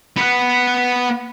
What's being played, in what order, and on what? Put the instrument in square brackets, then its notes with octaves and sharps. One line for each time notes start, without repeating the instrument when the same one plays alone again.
[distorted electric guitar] B3 B4